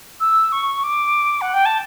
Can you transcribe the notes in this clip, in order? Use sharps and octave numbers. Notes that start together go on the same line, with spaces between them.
E6
C#6
D6
F#5
G5
A5